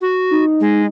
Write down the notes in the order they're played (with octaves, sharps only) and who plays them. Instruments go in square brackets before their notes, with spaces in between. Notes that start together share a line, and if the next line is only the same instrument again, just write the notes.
[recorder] F#4
[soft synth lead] D#4
[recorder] G#3